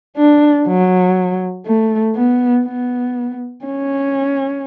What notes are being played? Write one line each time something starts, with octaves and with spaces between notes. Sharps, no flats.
D4
F#3
A3
B3
B3
C#4